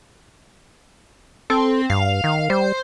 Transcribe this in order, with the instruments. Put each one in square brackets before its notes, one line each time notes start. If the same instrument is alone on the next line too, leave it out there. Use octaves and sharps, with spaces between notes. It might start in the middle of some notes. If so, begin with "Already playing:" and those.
[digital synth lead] C4 [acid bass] A4
[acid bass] G2 [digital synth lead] F5
[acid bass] D#3
[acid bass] G3 [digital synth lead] C5